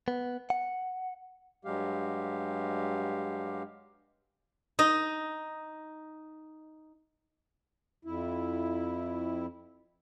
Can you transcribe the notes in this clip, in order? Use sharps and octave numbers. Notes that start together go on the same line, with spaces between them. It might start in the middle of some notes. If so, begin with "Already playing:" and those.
B3
F#5
G2 F#3 G#3 G4 F5
D#4 D#5
F2 E4